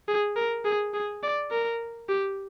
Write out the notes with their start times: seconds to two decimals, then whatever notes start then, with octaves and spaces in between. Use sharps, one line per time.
0.08 G#4
0.36 A#4
0.65 G#4
0.94 G#4
1.23 D5
1.51 A#4
2.09 G4